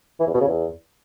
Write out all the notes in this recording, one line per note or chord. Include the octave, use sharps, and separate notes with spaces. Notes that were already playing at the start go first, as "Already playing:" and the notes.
E3
E2
B2
C#3
E2